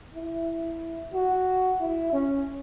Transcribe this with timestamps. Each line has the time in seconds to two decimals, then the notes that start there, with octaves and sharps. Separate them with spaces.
0.15 E4
1.14 F#4
1.80 E4
2.13 C#4